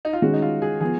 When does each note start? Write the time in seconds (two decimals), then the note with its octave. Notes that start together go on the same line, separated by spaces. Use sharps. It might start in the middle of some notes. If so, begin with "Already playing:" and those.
0.05 D#4
0.13 F4
0.22 D#3 G#3 C#4 F#4
0.33 D#4
0.42 F4
0.62 G#4
0.81 F3 B3 G#4